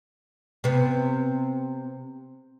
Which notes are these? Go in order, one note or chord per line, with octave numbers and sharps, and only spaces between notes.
C3 B3